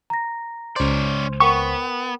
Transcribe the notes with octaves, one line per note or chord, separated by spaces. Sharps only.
A#5 A#6
C#2 C#4 C5 D5
B3 A#4 F#5 G5 C#6